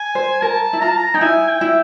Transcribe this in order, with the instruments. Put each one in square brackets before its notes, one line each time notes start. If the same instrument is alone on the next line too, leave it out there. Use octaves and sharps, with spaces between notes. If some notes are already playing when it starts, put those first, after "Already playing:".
Already playing: [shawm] G#5
[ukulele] C5
[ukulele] A#4 [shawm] A5
[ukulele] E4
[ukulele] F4 [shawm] A#5
[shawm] A5
A#5
[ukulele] D#4 [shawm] G5
[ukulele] E4 [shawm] G#5
[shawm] G5
[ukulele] E4